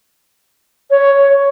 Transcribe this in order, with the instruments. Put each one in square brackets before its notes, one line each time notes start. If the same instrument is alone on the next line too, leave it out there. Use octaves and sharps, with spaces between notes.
[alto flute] C#5